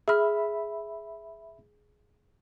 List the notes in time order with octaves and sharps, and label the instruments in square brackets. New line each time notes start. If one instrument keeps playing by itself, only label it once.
[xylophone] G#4 F6 [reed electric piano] E5 B5